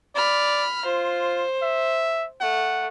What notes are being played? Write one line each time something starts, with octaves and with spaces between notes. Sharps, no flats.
D5 B5 F6
F4 C5
E5
A3 F#5